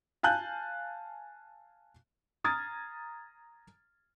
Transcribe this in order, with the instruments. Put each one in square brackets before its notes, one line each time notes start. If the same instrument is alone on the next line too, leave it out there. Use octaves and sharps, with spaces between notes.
[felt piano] F5 G#5 A5 F#6 G6
A#5 D#6 F6 G#6 A6